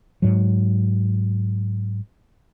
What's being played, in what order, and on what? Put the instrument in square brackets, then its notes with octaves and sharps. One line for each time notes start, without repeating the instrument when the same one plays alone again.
[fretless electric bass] G#2 F#3